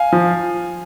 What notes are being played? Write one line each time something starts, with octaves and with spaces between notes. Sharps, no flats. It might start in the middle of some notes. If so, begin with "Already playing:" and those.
Already playing: F5 G#5
F3